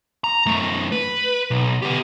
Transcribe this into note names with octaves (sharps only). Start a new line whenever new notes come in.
A#5
F#2 A3
B4
B1
B3 G4